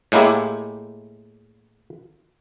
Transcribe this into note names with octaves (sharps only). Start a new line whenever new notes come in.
A2 G#3 A#3 E4 G4